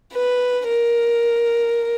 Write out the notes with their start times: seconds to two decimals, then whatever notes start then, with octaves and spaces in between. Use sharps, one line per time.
0.13 B4
0.68 A#4